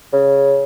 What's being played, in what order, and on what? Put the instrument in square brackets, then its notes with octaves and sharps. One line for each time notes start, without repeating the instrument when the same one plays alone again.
[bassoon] C#3